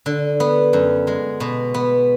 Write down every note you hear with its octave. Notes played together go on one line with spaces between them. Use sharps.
D3
B3
F#2
G#3
B2
B3